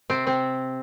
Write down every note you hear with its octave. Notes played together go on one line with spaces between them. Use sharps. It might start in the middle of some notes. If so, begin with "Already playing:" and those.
C3 C4
C3 C4